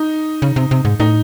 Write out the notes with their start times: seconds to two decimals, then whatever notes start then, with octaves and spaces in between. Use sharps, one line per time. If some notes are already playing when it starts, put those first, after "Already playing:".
Already playing: D#4
0.42 C#3
0.56 C3
0.71 C3
0.85 G#2
1.00 A2 D#4